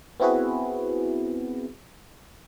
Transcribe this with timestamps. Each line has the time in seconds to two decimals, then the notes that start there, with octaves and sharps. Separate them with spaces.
0.20 B3 C4 E4 F#4 G#4 B4